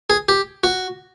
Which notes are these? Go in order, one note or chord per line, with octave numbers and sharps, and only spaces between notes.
G#4
G4
F#4